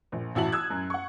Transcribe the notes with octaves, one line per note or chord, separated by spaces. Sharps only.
A#1
A1 E4 F#4 A5 F#7
D#6 E6 F#6 G#6
F#2
F#5 C#6